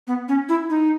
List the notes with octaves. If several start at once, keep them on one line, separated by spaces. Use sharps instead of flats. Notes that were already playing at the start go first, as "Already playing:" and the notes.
B3
C#4
E4
D#4